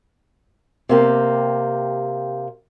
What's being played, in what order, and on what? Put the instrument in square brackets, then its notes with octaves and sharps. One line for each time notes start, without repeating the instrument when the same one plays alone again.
[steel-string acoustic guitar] C3 A#3 G4